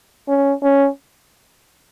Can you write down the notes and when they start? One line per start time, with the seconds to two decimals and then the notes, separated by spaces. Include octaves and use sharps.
0.29 C#4
0.63 C#4